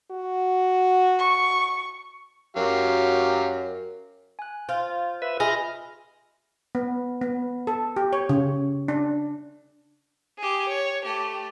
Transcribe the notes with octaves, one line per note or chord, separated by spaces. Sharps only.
F#4
C#6
F#2 F#3 G4 F5
G#5 F#6
F4 C5
B4 E5
F4 G#4 D#5 E5 B5 F6 A#6
B3
B3
A4
G4
C#5
C#3
D4
G4 G#4
C#5
A3 G4